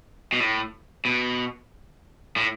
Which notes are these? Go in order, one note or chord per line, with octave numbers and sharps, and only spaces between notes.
B2
A2
B2
A2